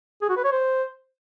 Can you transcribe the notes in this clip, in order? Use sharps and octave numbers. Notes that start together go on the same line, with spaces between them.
G#4
F#4
B4
C#5
C5